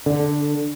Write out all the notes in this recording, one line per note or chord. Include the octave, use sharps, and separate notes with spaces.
D3